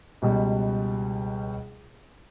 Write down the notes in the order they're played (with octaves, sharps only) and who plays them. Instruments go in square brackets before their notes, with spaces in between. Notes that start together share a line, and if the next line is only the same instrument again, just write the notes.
[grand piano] C#2 B2 G3